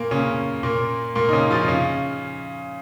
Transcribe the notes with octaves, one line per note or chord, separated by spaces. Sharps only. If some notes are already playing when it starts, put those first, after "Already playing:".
Already playing: A#2 A#3
C#3 C#4
A#2 A#3
A#2 A#3
D#4
C#3 C#4
F3 F4
D#4
C#3 C#4